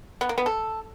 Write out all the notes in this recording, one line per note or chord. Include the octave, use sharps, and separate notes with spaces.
B3
A#3
B3
A4